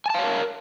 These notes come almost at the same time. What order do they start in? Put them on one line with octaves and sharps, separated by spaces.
G#5 A5 F5 C#5 A#4